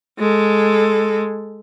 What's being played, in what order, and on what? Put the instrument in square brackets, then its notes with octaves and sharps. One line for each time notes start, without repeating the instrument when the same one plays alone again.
[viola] G#3 A4